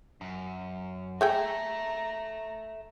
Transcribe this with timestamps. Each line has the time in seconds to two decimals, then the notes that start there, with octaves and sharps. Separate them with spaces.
0.21 F#2
1.21 A3 G#4 A4 E5 G5 A#5